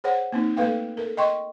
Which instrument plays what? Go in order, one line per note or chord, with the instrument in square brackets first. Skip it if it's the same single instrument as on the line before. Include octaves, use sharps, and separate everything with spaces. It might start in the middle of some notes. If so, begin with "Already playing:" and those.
[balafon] G#4 C5 C#5 F#5
A#3 C4 D#4
A3 A#3 A4 B4 F5 G5
A4 A#4
D#5 G5 C6 C#6